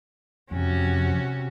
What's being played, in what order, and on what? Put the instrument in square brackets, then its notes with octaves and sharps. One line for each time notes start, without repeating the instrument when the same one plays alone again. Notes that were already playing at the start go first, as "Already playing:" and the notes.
[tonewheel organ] F2 [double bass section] C3 [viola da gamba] C#4 F#4